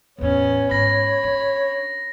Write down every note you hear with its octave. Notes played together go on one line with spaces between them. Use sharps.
A1 E2 B3 C#4 C#5
G#2 B5 A#6
D4